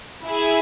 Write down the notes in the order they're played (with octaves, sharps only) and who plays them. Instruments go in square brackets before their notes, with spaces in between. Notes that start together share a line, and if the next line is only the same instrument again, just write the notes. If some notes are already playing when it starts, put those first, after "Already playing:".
[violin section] E4 G#4 E5 G#5